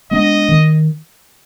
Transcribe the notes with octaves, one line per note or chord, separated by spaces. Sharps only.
G#3 B3 D4 D#5
D#3